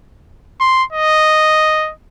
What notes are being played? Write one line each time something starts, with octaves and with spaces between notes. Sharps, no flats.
C6
D#5